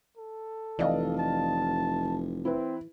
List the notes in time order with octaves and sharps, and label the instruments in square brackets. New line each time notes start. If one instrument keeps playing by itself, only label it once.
[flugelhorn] A4
[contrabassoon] F1 [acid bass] E3 [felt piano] D5 D#5 F5
[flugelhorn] A5
[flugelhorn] C4 [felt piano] E4 B4